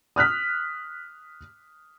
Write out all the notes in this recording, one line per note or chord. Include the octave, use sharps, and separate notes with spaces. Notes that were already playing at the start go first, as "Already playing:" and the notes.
D#6 F6 F#6 B6